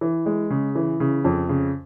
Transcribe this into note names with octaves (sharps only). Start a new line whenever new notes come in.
E3
G#3
C#3
E3
C#3
F2
C#3